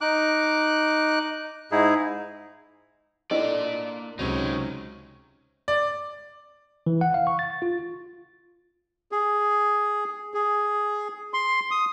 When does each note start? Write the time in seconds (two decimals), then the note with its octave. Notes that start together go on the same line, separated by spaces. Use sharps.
0.01 D#4 D6 F#6
1.72 G#2 D#4 E4 G#4
3.31 A#3 D4 E4 A4 D5 D#5
4.19 C#2 C3 F#3 C4 C#4 D#4 C#5
5.68 D5
6.86 E3
7.01 F#5
7.14 F5
7.27 C#6
7.39 A6
7.62 F4
9.12 G#4
10.34 G#4
11.34 C6
11.71 D#6